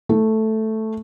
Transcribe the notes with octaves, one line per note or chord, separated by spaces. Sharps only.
A3